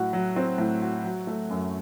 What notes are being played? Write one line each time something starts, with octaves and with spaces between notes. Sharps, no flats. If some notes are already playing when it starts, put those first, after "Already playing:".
Already playing: A2 F#3 F#4
F#3
C4
A2
F#4
F#3
A3
F#2